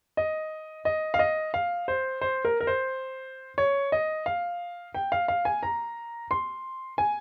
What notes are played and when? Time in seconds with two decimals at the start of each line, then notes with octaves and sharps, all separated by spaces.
0.17 D#5
0.85 D#5
1.14 F5
1.19 D#5
1.54 F5
1.88 C5
2.21 C5
2.45 A#4
2.61 A#4
2.67 C5
3.58 C#5
3.92 D#5
4.26 F5
4.94 G5
5.12 F5
5.28 F5
5.45 G#5
5.63 A#5
6.31 C6
6.98 G#5